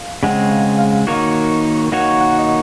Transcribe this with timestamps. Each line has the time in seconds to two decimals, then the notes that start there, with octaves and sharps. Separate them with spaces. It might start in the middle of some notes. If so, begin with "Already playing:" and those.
Already playing: F5
0.23 C#3 G#3 C4 F#5
0.51 F5
0.79 F5
1.07 D#3 A#3 D#4 F#4 C#5
1.92 D#3 A#3 D#4 F#4 C#5 F#5
2.21 F#5
2.39 D#5